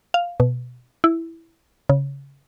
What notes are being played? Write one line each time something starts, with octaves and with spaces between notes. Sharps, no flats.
F5
B2
E4
C#3